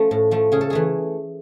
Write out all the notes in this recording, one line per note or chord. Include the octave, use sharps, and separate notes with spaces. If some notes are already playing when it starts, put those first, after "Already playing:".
Already playing: F3 A3 C#4 A4
A2
F3 A3
C#3 G#4
A4
E3 A3 G#4